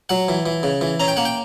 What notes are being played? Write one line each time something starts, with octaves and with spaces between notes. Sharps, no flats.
F#3 F#5
E3
E3
C#3
E3
C#4 A#5
G5
A#3 F#5
G5